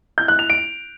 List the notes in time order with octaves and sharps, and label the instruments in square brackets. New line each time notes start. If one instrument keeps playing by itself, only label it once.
[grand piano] G6
F#6
F7
D7